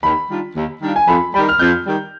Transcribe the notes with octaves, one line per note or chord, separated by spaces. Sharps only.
D#2 B5
D#3 G3 D4 F4
D#2
D#3 G3 D4 F4
G#5
F2 B5
D#3 G3 B5
F6
F2 G6
D#3 G3